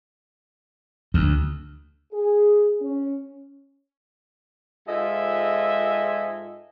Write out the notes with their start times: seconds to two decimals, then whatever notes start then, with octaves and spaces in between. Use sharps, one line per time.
1.14 D2
2.13 G#4
2.82 C#4
4.87 G#2 F4 A4 D#5 E5 G#5